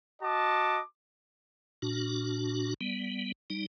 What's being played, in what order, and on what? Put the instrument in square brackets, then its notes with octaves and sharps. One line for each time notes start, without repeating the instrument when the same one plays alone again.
[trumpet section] F#4 D#5 A5 D6
[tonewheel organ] A#2 D4 F#4
G3 B3
G3 D#4